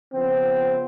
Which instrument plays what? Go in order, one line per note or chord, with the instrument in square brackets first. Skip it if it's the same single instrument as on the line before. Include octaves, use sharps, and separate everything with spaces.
[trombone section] C#3 F3 B3 C4